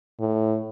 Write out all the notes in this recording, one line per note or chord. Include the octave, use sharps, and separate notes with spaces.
A2